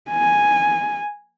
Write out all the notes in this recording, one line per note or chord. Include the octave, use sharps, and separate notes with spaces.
G#5